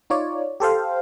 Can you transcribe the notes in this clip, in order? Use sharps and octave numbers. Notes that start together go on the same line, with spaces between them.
D#4 F4 C#5 D5
G4 A4 C5 F5